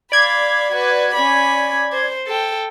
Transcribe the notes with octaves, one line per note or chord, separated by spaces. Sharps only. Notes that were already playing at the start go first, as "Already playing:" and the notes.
D5 F5 B5 G#6
F#4 B4
C#4 B5
C5
A4 G5